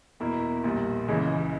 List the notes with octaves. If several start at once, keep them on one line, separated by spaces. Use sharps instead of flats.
E2 B2 A#3 E4
A#1 A#2 G3
C#2 C#3 E3 G#3